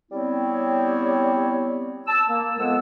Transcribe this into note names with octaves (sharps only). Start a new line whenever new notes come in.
G3 B3 C4 E4 C#5
A5 E6
A#3
F2 G#3 B3 F#5 E6